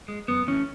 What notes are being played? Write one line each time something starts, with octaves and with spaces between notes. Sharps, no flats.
G#3
F#2 B3
E3 A3 C#4